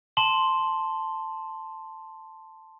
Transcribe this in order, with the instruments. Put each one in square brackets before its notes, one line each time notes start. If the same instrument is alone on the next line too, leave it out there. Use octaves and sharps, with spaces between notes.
[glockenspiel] A5 C6 F#7